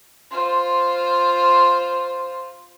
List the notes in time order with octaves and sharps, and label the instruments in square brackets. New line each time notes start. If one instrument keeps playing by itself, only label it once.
[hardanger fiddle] F4 C5